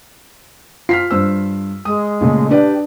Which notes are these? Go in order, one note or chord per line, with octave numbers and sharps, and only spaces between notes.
F4 F6 B6 C7
G2 C5 E6
G#3 D#6
A#2 C#3 A3
D4 G4 B4 D5